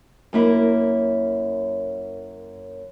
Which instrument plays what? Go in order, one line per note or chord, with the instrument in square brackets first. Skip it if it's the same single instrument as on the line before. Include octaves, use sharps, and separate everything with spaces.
[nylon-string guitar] F#2 A#3 E4